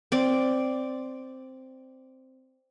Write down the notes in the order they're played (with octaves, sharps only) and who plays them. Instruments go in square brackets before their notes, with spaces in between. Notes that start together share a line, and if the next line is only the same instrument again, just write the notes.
[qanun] C4 D5